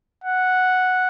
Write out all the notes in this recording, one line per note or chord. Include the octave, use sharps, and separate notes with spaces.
F#5